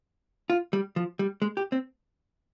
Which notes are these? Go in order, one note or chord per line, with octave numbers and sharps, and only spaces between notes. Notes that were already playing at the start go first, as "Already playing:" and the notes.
F4
G3
F3
G3
G#3
G4
C4